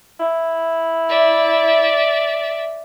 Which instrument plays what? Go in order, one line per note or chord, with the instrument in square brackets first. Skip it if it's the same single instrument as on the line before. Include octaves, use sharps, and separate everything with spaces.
[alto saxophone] E4
[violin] D5 E5